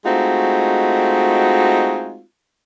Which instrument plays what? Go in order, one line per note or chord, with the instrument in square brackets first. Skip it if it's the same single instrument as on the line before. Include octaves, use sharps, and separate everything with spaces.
[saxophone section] G#3 A3 C4 D#4 F4 F#4